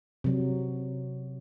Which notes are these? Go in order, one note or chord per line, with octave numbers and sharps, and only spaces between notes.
C3 F#3